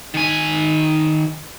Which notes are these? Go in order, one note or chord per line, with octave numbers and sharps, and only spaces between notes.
D#3 G#5